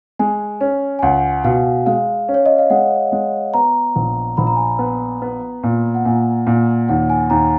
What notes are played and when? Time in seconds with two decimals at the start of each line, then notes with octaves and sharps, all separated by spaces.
0.19 G#3 G#5
0.61 C#4
0.99 G#5
1.02 C#2 F#5
1.44 B2 F5
1.86 G#3 F5
2.28 C#4
2.34 C#5
2.46 D#5
2.59 F5
2.70 G#3 F#5
3.12 G#3
3.54 B3 A#5
3.96 A#1
4.37 A#1 B5
4.47 A#5
4.56 G#5
4.66 A#5
4.79 B3
5.22 B3
5.63 A#2
5.95 F#5
6.05 A#2 G#5
6.47 A#2
6.88 D#2 F#5
7.10 G#5
7.30 D#2 A#5